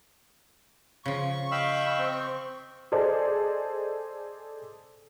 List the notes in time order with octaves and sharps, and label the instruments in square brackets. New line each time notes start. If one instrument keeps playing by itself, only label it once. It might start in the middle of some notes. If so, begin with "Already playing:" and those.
[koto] C#3 F3 [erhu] C#6
[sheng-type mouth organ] D#5 G5 [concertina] F5 B5 E6
[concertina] C4
[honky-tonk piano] G#4 A4 C5 D5 D#5